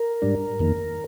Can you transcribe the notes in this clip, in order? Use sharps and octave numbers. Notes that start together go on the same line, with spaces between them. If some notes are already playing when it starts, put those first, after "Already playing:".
Already playing: A#4
G#2 G3 D4
F2 D#3 A#3